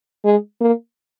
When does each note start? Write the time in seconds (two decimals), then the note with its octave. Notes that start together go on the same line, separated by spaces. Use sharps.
0.24 G#3
0.60 A#3